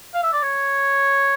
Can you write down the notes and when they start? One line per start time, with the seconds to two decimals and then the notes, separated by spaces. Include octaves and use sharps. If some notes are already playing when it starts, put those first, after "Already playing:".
0.14 F5
0.23 E5
0.33 D5
0.43 C#5